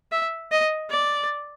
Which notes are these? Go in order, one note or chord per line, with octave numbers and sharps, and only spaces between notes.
E5
D#5
D5